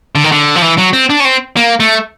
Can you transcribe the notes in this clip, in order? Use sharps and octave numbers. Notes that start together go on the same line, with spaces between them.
D3
D#3
D3
F3
E3
F#3
C4
D4
C#4
C4
A#3
A3